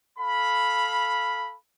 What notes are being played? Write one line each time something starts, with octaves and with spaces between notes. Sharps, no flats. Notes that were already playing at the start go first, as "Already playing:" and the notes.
A4 F5 B5